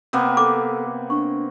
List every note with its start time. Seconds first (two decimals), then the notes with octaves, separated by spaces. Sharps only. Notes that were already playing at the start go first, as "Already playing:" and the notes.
0.13 C3 A#3 B3
0.37 A4 D6
1.10 D4 C#6